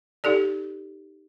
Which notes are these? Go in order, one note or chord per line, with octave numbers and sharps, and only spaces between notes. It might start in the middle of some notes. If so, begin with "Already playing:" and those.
D#4 G4 A4 D5